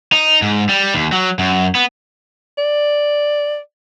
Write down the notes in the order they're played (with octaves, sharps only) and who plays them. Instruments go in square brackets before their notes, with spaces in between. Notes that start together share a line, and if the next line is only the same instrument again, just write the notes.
[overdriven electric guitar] D#4
G#2
G3
D#2
F#3
F#2
B3
[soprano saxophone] D5